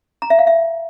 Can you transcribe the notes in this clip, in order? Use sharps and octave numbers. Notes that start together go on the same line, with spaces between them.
A#5
E5
F5
E5